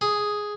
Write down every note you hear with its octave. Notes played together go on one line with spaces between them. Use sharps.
G#4